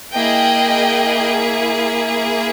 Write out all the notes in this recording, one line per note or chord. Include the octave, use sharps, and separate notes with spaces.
A#3 E4 G#4 D#5 G5